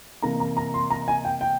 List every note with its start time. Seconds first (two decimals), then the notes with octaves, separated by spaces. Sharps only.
0.22 C3 E3 A#3 A#5
0.40 A#5
0.57 A#5
0.74 C6
0.90 A#5
1.08 G#5
1.25 G5
1.41 G5